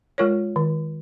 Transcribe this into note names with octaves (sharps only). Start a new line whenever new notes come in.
G#3 F4 A#4 C#5
D#3